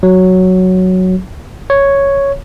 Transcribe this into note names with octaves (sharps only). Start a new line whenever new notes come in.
F#3
C#5